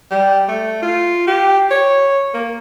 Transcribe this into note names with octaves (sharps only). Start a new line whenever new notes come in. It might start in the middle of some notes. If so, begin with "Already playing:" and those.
G3
A3
F4
G4
C#5
A#3